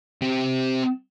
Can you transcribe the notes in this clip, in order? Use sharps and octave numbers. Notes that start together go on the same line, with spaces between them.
C4 G4